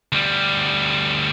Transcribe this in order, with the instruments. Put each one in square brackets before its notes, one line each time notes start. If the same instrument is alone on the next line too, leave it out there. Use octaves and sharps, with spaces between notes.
[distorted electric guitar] D2 G3